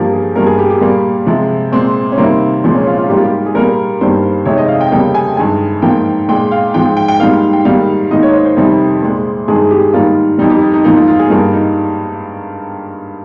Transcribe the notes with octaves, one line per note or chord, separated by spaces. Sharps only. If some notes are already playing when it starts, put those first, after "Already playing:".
Already playing: G2 F3 A#3 G4
G#4
G2 G3 A#3 A#4
G#4
G4
G4
A#2 G3 A#3
C3 F3 G#3
A#2 G#3 C4
C#4
C3 D#3 G3 A#3 C4
A#2 F3 G#3 C4
C#4
F4
F4
G#2 G3 A#3 G4
F4
G4
G#4
A#2 G3 A#3 A#4
G2 D#3 G3 A#3 C5
F2 C3 D#3 G#3 C#5
D#5
F5
G5
F2 C#3 G3 A#3 G5
G#5
G2 D#3 G#3 G#5
G#2 F3 A#3 G5
A#2 G#3 G5
F5
G#2 F3 G#3 G5
G5
G5
G5
G#2 G3 A#3 F5
G5
G#2 D#3 G3 A#3 F5
G#2 D#3 A#3 D#5
C#5
C5
C5
F2 C3 D#3 G3
A#2 G#3
G2 D#3 G#3 G#4
G4
G#2 D#3 G3 A#3 F4
F2 D#3 G3 D#4
G4
D#4
G#2 F3 A#3 D#4
F4
F4
G#4
G2 G3 A#3 F4
D#4